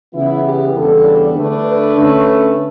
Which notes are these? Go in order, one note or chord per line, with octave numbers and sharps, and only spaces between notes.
C#3 E3 B3 E4
G4
E2 C#3 G3 B3 D4 A4
D3 A3 D4 B4
B4
D3 A3 C#4